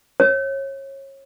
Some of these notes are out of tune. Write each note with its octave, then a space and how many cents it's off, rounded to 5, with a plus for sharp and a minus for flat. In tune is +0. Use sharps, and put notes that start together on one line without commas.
C#5 -30